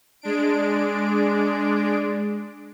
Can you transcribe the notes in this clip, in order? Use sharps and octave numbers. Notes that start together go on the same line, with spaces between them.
G#3 D4 D7